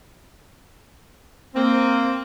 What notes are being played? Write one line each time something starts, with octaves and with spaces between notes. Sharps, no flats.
A#3 C4